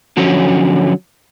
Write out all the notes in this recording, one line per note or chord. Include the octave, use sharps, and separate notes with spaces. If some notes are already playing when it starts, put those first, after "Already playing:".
D3 F3 F#3 C#4 F#4